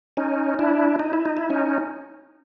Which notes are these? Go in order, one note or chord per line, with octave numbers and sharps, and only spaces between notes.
C#4 D#4
D4 E4
D#4
E4
D#4
E4
C#4 D#4